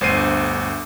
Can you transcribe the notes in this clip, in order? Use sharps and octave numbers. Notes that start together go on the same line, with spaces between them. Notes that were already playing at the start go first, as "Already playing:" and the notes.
G1 D2 C5 C7 D#7